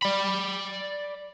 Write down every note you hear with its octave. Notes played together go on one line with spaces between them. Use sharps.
D5 B5